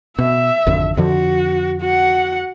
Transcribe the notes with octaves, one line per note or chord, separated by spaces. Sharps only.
B2 E5
G#1 F2 D3
F2 D3 F3 F#4
F#4 F#5